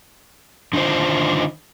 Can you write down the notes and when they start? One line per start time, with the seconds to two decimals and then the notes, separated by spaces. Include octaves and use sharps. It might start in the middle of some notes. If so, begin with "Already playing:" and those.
0.73 D3 D#3 D#4 F4 C5